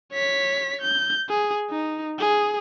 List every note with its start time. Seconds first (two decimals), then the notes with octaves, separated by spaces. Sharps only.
0.13 C#5 B6
0.82 G6
1.29 G#4
1.70 D#4
2.19 G#4